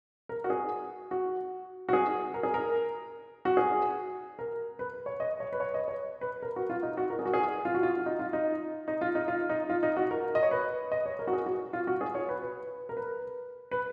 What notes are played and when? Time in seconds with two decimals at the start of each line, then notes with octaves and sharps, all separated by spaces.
0.29 A#4
0.44 F#4
0.50 G#4
1.11 F#4
1.89 F#4
1.93 G#4
2.34 A#4
2.43 G#4
2.54 A#4
3.45 F#4
3.57 G#4
4.39 A#4
4.79 B4
5.06 C#5
5.20 D#5
5.40 C#5
5.53 B4
5.60 C#5
5.74 D#5
5.88 C#5
6.21 B4
6.42 A#4
6.56 F#4
6.70 F4
6.83 D#4
6.97 F#4
7.10 A#4
7.19 G#4
7.25 F#4
7.34 G#4
7.65 F4
7.74 F#4
7.83 F4
8.06 D#4
8.19 F4
8.33 D#4
8.88 D#4
9.01 F4
9.15 D#4
9.28 F4
9.49 D#4
9.70 F4
9.83 D#4
9.97 F#4
10.11 A#4
10.35 D#5
10.43 C#5
10.51 B4
10.92 D#5
11.06 C#5
11.19 A#4
11.27 F#4
11.33 G#4
11.46 F#4
11.73 F4
11.87 F#4
12.01 G#4
12.15 C#5
12.29 B4
12.42 B4
12.89 A#4
12.97 B4
13.71 B4